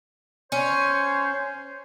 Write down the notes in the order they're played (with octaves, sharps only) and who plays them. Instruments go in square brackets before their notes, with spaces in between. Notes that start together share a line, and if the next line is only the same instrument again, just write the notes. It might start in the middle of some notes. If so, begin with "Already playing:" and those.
[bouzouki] C#4 [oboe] C5 [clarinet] C#5